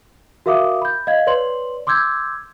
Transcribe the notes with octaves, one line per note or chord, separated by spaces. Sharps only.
F#4 A#4 E5 F5 D6 D#6
B5 G6
D#5 F5 G#6
B4 C#5 D5 C6 F#7
C6 D6 E6 G6 G#6